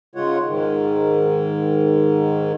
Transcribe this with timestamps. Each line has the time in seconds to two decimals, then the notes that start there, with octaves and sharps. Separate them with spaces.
0.15 G#2 C#3 G#3 F4 C#5 F#5
0.47 G#2 D#3